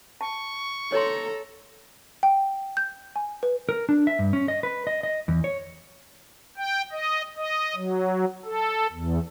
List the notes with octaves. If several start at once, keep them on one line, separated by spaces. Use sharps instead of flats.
A5 C#6
A4 C#5 A#5 C6
G5
G6
G#5
B4
A#4
D4
E5
G2
C#4
D#5
B4
D#5
D#5
E2
C#5
G5
D#5
D#5
F#3
A4
E2